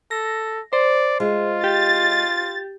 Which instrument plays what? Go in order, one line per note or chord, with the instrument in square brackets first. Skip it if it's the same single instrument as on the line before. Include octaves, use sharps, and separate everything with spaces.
[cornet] A4 [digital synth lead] A#6
[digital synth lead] C5 [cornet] D5
[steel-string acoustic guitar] G#3 [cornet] F4
[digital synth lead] G4 [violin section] A6